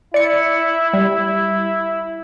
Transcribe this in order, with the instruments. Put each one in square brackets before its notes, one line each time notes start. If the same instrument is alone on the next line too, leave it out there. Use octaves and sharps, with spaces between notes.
[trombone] E4 [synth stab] D5 C#7
[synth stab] G3